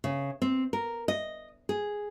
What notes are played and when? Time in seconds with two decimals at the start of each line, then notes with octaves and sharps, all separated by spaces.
0.04 C#3
0.42 C4
0.73 A#4
1.08 D#5
1.69 G#4